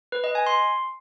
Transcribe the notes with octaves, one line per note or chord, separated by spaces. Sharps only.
B4
D#5
G#5
C6